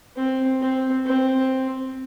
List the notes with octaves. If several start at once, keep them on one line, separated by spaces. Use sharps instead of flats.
C4
C4
C4